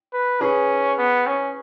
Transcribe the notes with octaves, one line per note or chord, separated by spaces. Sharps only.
B4
C#4 G#4 B4
B3
C#4